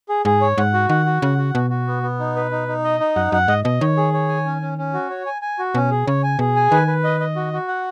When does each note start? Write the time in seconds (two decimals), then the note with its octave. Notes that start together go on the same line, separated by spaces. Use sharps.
0.09 G#4
0.25 G#2 G#4
0.41 C#5
0.58 G#2 F#5
0.74 F#4
0.89 D#3 F#5
1.06 F#4
1.22 C#3 F#5
1.38 F#4
1.54 B2 F#4
1.70 F#4
1.87 B3
2.03 B3
2.19 D#4
2.36 B4
2.51 D#4
2.68 D#4
2.84 D#5
3.00 D#4
3.16 F#2 F#5
3.32 F#2 F#5
3.48 G#2 D#5
3.64 B2 D#5
3.81 D#3 C#5
3.97 G#4
4.13 C#5
4.29 G#5
4.46 C#4
4.61 C#4
4.78 C#4
4.93 F#4
5.10 C#5
5.26 G#5
5.42 G#5
5.59 F#4
5.75 B2 C#4
5.91 G#4
6.07 C#3 C#5
6.23 G#5
6.39 B2 G#4
6.56 G#5
6.71 D#3 B4
6.87 B4
7.04 D#5
7.20 D#5
7.36 F#4
7.53 F#4
7.68 F#5